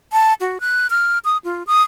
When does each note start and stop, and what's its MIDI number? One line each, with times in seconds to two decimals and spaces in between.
0.13 0.34 81
0.40 0.58 66
0.61 0.87 90
0.90 1.18 89
1.25 1.37 87
1.44 1.63 65
1.67 1.82 87